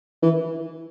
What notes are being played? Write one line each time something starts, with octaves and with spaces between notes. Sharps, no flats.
E3